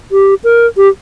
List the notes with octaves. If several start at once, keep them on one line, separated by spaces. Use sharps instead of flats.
G4
A#4
G4